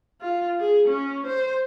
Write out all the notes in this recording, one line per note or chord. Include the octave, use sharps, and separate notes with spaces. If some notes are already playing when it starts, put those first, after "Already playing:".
F4
G#4
C#4
C5